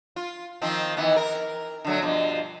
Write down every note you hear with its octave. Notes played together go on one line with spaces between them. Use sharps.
F4
D#3 F3 C4
D#3 E3 B3
A#4
D3 F#3 A3
G2 B2 F3